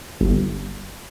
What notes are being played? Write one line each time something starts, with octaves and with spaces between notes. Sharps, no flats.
G1